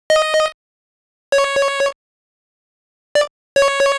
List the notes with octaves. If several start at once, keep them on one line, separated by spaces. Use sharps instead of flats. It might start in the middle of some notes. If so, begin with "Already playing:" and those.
D#5
C#5
D5
C#5